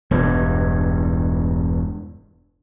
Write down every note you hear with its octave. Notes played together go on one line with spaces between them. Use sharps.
E1 E2 G2